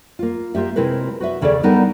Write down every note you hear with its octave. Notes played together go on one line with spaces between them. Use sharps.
A#3 F4
A#3 F4 G4 E5
C3 G#3 C4 E4 A#4 B4
F#4 B4 E5
D#2 C#3 G#4 A4 C#5 D5
G3 B3 D4 D#4 A4 A#4